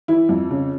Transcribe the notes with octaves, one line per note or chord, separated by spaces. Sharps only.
E3 E4
F2
C#3